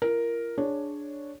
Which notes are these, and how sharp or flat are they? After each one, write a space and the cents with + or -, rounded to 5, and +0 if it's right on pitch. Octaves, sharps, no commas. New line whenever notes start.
F4 -40 A#4 +0
D4 +0 G#4 +0 C#5 +0